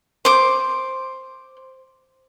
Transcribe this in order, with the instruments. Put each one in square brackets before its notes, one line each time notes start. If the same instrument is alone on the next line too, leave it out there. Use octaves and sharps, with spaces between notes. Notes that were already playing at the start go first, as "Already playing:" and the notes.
[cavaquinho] C5 D6